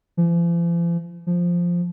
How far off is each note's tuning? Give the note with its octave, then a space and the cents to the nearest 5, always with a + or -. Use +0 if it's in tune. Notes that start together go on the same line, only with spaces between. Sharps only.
F3 -45
F3 +0